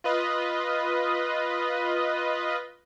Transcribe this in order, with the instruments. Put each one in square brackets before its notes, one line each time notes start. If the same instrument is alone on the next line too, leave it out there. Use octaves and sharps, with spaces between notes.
[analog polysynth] F4 B4 D#5